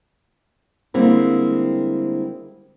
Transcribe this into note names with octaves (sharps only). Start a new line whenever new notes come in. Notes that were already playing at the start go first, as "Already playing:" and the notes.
D3 G3 G#3 A#3 C4 E4